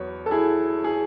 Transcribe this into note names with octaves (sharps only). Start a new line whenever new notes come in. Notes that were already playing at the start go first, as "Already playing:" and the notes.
Already playing: E2 F#3 B3 C#5
A4
E4 G#4
G#4